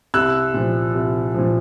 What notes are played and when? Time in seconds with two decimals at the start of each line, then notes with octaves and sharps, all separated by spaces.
0.14 C2 E6 F#6
0.54 A#2 F3
0.94 C2
1.34 A#2 F3